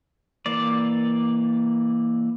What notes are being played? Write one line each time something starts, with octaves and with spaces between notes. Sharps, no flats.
E3 A#3 D5